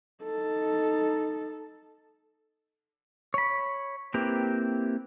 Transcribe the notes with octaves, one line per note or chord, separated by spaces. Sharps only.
D#4 A4
C#5 B5
A#3 C4 E4 G4 B4